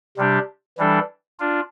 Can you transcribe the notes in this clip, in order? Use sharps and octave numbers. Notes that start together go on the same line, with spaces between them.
C3 G3 D4 G4
E3 G3 D4 A4
D4 F4